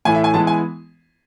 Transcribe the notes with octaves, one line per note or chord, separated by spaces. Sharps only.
A2 E3 A3 E4 G#5
E5
G#5
E3 G#3 B3 E4 A5
G#5